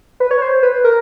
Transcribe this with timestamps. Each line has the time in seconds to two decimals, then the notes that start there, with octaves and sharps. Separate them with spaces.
0.20 B4
0.31 C#5
0.42 C5
0.63 B4
0.84 A#4